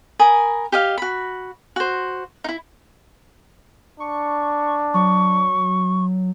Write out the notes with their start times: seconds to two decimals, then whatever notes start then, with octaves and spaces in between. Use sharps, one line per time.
0.19 A#4 G#5 B5 D#6
0.72 G4 D#5 F5
0.98 F#4 B5
1.76 F#4 C5
2.44 D#4 E4
4.00 D4 C#6
4.94 F#3 C#6